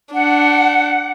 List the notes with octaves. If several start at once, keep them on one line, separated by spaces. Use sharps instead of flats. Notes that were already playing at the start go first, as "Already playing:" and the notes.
D4 F#5